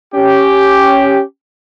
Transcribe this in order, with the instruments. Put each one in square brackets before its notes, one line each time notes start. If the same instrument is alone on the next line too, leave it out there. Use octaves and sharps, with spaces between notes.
[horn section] C#4 G4